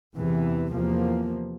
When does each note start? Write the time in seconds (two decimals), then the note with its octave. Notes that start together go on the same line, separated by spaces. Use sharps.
0.16 E2 C3 E3
0.73 E2 C3 F3 A#3